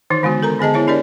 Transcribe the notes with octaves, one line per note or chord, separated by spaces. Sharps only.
D#3 E3 D#4
D3 G#3 B3 F#4
A4 A#4 A#5
D3 B3 G#4 D#5 A5
B3 E4 C#5 E5
D4 G4 A#4 C#5 D5